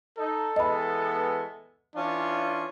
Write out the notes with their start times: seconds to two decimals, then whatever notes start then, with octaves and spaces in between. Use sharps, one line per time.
0.18 D#4 A4
0.56 E3 G#3 B3 D#5 B5
1.95 E3 C#4 D4 F4